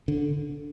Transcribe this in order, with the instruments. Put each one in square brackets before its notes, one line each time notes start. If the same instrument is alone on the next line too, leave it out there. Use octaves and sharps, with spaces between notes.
[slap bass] D3